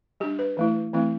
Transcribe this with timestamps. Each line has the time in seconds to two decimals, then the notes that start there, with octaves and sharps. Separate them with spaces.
0.20 G3 D4 G4
0.39 B4
0.57 E3 A3 E4
0.93 E3 A3 C4 E4